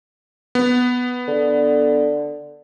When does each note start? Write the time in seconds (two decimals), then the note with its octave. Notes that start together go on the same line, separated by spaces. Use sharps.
0.55 B3
1.28 D3